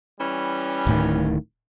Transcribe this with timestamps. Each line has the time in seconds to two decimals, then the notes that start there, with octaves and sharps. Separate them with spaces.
0.19 E3 G3 C#4
0.87 D1 A2 D#3